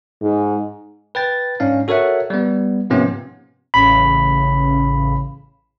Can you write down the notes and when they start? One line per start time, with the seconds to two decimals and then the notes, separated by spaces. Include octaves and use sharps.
0.22 G#2
1.15 B4 G5 A6
1.60 G#2 C#4 D4 F5
1.88 F#4 A4 A#4 C#5 E5 F#5
2.30 G3 B3
2.90 G#2 C3 F3 A#3 B3 C#4
3.74 A1 C#3 B5